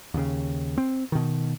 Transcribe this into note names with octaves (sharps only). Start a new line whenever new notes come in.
D#2 C#3
C4
B2 D#3